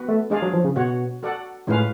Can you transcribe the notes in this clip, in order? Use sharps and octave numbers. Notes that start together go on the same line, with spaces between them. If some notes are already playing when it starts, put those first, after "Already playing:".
Already playing: B3 F#4 B4 F#5
A3
G#3 D4 G#4 D5 F5
F#3
F3
C#3
B2 F#4 C#5 F#5
F#4 A4 D5 F#5
A2 G#3 C#4 F4 B4 F5